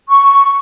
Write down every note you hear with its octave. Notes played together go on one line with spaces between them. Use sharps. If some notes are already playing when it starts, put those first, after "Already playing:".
C#6